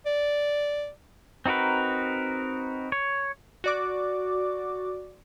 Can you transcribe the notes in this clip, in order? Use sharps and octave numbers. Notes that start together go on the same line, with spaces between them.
D5
C4 D#4 F#4 A#4 B4
C#5
F#4 D5 D6